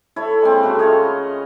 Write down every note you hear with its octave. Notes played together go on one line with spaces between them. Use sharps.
E4 A4 C#5
G#3 A#3 C4
C#3 A3 E4 F#4
F4 G#4 C#5 D#5